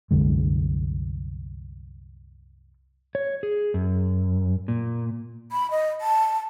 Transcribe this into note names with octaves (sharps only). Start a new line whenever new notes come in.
C2 F#2 D3 G#3
C#5
G#4
F#2
A#2
B5
D#5
A5